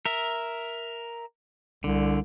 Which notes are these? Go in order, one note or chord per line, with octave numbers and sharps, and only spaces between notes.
A#4 E5
C2 D3